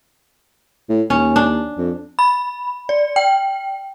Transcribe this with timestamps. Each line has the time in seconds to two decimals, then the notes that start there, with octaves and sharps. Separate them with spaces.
0.90 A2
1.10 D#2 C#4
1.36 D4
1.78 F2
2.19 B5
2.89 D5
3.16 G5